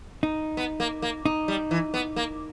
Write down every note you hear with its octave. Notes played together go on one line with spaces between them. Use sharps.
D#4
B3
A#3
A#3
D#4
G3
E3
B3
A#3